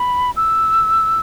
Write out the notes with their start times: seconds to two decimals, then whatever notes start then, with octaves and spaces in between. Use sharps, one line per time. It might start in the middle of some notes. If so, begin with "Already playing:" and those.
Already playing: B5
0.37 E6